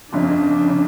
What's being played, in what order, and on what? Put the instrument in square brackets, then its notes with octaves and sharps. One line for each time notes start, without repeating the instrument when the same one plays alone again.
[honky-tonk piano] G1 F2 C#3 [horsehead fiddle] D4
[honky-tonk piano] C#3